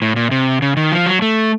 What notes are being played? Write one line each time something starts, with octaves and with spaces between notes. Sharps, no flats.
A2
A#2
C3
C#3
D#3
F3
F#3
A3